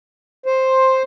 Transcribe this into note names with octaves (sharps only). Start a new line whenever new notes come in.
C5